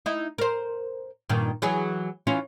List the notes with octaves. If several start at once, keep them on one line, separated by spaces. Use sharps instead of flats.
D#4 E4
A#4 C5
G2 A#2 D#3
E3 F#3 G#4
E3 C#4 F4